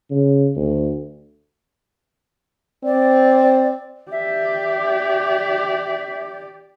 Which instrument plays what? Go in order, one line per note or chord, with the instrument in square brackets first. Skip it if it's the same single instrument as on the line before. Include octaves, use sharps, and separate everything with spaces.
[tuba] C#3
D2
[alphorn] C4 [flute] D5
[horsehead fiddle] G4 D5 [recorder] E5